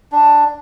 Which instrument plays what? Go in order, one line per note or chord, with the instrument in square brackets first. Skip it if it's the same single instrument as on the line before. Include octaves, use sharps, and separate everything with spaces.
[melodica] D4